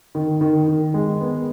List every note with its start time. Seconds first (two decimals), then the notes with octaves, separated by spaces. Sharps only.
0.15 D#3
0.41 D#3
0.67 D#3
0.94 G#3
1.21 B3